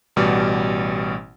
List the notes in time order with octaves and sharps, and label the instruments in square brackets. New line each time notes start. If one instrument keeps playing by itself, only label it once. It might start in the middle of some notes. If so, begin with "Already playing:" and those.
[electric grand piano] A1 B2 G3 D5